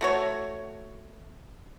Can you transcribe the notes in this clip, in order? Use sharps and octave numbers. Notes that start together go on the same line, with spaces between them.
A3 F#4 C#5